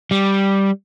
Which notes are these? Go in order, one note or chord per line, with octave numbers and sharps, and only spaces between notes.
G3